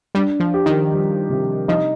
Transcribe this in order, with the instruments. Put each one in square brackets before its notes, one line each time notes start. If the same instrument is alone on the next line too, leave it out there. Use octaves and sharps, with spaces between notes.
[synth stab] G3 [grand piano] D4
[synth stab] F3
[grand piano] G4
[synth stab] D#3
[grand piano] G3
C3
[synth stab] F3 [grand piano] D#4